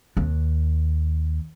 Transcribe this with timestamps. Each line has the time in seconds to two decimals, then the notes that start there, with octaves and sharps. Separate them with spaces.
0.17 D#2